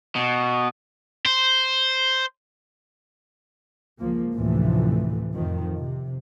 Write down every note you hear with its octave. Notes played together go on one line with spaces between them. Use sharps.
B2
C5
C#2 F3 A#3
A1 D2 C3 E3 F3 A3
F2 D#3 F3
C3